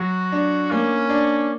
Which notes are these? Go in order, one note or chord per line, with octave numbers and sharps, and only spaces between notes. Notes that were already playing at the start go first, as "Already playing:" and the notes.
Already playing: F#3 F#4
D4
A#3 C#4
D4